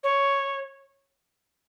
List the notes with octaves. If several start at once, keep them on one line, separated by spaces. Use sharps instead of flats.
C#5